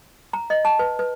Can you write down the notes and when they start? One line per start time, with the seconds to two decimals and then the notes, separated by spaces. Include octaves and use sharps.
0.33 A#5
0.50 D#5
0.65 A5
0.79 B4
0.99 B4